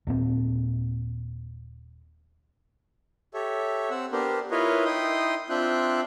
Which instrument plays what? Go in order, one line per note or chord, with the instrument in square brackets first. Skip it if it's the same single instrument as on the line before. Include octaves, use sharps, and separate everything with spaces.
[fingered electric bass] D#1 A#2 C4
[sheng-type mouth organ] G4 A4 C#5 E5
C4 F#5 E6
B3 D4 G4 A#4 C5
E4 F4 A#4 B4 C#5 D#5
D#4 E4 G5 C6 D#6
C4 D4 F4 E5 G5 F#6